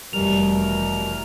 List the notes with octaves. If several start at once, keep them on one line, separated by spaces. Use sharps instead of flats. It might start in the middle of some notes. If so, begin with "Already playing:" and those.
F1 F2 B2 E3 G3 A#4 F7